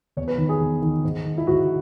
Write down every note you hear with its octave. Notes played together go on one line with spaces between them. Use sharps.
E2 C#5
B4
D#3
G#4
E2
D#3
G#2
D#3
E4
G#2 F#4